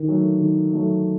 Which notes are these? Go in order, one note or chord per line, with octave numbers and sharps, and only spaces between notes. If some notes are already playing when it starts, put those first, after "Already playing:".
Already playing: D#3
F#3 A3
D#3
F#3 A3